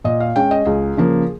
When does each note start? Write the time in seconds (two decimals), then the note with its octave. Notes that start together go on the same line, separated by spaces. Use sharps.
0.04 A#2 D#5
0.20 F5
0.36 G#3 C#4 G5
0.51 D#5
0.65 C#2 G#4
0.97 C#3 F3 A#3